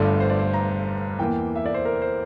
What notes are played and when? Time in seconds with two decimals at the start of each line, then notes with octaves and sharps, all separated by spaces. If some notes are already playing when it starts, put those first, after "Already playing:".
Already playing: G1 G2 D3 A3 D5
0.20 C5
0.30 D5
0.39 C5
0.54 A#5
1.19 E2 E3 A#3 G5
1.56 E5
1.66 D5
1.74 C5
1.85 A#4
2.02 C5